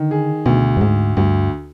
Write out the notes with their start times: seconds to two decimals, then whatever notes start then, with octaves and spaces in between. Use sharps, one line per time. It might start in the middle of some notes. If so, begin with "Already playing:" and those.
Already playing: D3 D#3
0.11 G#4
0.46 D2 B2
0.77 G2
0.81 D2 G#2
1.17 D2 G2